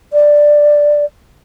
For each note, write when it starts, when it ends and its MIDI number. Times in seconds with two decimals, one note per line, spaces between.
0.13 1.05 74